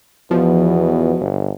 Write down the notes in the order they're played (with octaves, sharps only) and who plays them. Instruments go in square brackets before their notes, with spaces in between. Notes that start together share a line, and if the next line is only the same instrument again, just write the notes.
[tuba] E2 [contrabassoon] B2 [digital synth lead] F3
[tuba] G1